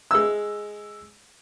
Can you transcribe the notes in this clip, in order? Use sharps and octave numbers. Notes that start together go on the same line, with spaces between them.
G#3 E6